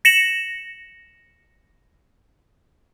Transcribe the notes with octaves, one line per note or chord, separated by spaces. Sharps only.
A#6 C#7 E7 F#7